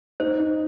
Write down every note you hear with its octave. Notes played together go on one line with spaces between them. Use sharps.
D#4 C5
D#4